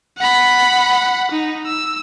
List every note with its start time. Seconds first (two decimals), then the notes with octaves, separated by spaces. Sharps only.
0.18 F#5 B5
1.31 D#4
1.66 E6